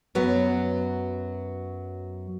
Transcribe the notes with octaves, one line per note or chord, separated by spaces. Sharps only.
F#2 F#3 B3